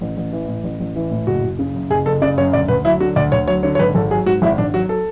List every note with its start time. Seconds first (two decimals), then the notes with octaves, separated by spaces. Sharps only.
0.01 A1
0.17 A1
0.32 E3
0.48 A2
0.64 A1
0.80 A1
0.96 E3
1.11 A2
1.27 F#1 F#4
1.43 F#1
1.59 C#3
1.75 F#2
1.90 F#1 G#4
2.06 F#1 A4
2.22 C#3 D5
2.38 F#2 C#5
2.53 D2 D5
2.68 D2 B4
2.85 F#3 E4
3.00 D3 F#4
3.16 D2 D5
3.32 D2 C#5
3.48 F#3 C#5
3.63 D3 C#5
3.75 C#5
3.79 G#1 B4
3.95 G#1 A4
4.11 F#3 G#4
4.26 G#2 F#4
4.42 G#1 E4
4.58 G#1 D4
4.74 F#3 F#4
4.89 A4